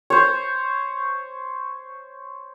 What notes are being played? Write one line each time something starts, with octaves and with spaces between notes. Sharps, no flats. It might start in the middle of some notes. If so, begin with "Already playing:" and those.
C5 C#5